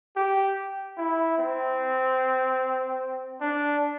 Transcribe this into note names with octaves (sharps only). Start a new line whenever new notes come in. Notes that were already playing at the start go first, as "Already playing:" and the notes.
G4
E4
C4
D4